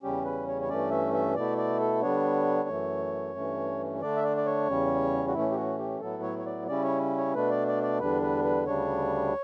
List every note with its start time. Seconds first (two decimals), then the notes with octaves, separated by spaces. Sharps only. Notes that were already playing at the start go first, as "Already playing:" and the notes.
0.03 E2 C#3 G3 C#4 G4
0.24 B4
0.48 C#5
0.62 C#5
0.69 G2 E3 A3 C#4 D5
0.91 E5
1.14 E5
1.36 B2 A3 E4 D5
1.58 D5
1.80 A4
2.02 D3 G3 B3 D4 C#5
2.69 F#2 E3 A3
3.35 G2 E3 A3 C#4
4.01 D3 A3 D4 D5
4.17 E5
4.24 D5
4.37 D5
4.46 C#5
4.68 E2 C#3 G3 C#4
5.28 F#4
5.34 A2 E3 A3 C#4 E4
5.51 G4
5.56 F#4
5.78 G4
6.00 A2 F#3 B3 E4 A4
6.23 C#5
6.39 C#5
6.46 D5
6.67 C#3 G3 C#4 E4 D5
6.84 C#5
7.18 C#5
7.34 B2 A3 D4 B4
7.51 D5
7.68 D5
7.83 D5
8.00 E2 D3 G3 D4 B4
8.22 B4
8.44 B4
8.66 D2 C#3 G3 D4 C#5